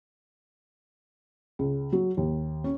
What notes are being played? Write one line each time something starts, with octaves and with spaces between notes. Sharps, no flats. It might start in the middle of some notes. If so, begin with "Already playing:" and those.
C#2
F#3
D#2
C#4